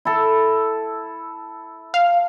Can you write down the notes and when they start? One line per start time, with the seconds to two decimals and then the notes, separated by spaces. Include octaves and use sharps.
0.05 E4 A4
1.94 F5